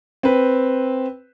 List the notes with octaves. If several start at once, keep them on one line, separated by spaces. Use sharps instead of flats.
C4 B4